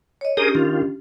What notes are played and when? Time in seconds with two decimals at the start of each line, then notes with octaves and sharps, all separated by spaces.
0.21 C#5 D#5
0.37 C#4 D4 G4 G#4 A#4 D#6
0.55 D#3 F4